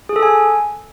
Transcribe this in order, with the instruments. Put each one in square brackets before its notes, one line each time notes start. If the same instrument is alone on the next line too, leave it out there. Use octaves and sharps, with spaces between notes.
[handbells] G#4
A4
G#5